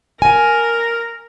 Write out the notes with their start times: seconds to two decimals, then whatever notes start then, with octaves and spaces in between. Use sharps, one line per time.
0.22 A#4 G#5